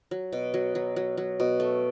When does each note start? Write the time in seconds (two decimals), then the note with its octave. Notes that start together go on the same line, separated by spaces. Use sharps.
0.11 F#3
0.32 B2
0.54 F#3
0.75 F#3
0.96 F#3
1.17 F#3
1.40 B2
1.60 A3